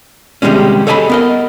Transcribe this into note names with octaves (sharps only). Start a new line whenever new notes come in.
C3 D#3 G3 G#3 C#4
A4 C#5 D#5 G#5 A5 B5
B3 A#4 D#5